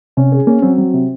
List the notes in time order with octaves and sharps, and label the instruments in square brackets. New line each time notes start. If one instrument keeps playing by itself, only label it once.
[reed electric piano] C3 [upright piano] C#4
[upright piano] G#4
[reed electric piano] A#3 [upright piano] C#4
[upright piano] F#3 [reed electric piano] C4
[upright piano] F#3
C3